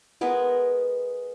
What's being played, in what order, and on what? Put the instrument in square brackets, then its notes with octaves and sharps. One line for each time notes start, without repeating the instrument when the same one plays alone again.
[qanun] G#3 B3 A#4 B4